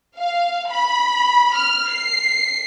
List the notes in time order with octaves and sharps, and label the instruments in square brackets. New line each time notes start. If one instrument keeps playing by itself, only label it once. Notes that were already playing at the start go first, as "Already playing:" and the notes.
[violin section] F5
B5
F6
C7